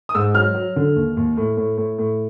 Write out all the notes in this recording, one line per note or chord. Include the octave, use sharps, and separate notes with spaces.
D#6
G#2 E6
F#3 F6
F#3
D3
D#2
D#2
A2
A2
A2
A2